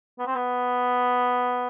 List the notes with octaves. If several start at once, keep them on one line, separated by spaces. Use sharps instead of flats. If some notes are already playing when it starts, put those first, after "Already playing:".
B3
C4
B3